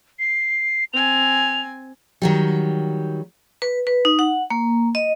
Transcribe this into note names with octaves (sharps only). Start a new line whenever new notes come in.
C7
C4 G#5 F7
D#3 F#3 G3
B4
B4
D#4
F#5
A#3
D#5